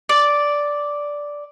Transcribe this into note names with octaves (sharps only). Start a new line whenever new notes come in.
D5